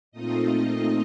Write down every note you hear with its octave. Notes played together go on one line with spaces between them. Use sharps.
A#2 A3 C4 D#4 F4 D#5